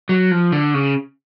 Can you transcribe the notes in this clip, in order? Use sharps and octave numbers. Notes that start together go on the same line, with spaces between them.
F#3
F3
D3
C#3